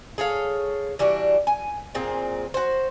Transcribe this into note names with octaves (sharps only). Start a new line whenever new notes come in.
G#4 A4 C#5 F5
E3 G3 D4 F#4
G#5
A#2 C4 G#4
F#4 C5